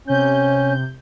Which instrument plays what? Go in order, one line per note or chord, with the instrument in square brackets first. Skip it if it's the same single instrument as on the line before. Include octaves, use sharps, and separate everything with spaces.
[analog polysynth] C3 G6 [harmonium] C#4